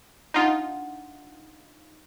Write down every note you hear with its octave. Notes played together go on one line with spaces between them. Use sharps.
D4 D#4 F4 F#5 A5